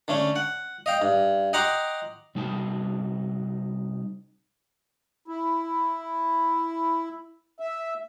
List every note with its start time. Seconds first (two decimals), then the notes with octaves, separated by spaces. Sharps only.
0.08 D3 A3 C#4
0.36 F#5
0.86 D#5 F5 G5
1.02 G2
1.53 D#5 F#5 G5 A#5 C6 D6
2.35 C3 G3 D#4 F#4 A5
5.28 E4
7.60 E5